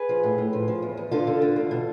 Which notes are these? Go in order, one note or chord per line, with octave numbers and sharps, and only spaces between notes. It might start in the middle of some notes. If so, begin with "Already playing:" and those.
Already playing: G#4 B4
F3
A2
A2
F3
F3
E2
E2
D3 F4 A4
D3
D3
E2
B2